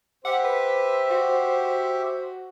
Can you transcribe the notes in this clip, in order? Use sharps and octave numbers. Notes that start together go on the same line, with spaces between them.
G4 C5 E5 F#5
B4
F#4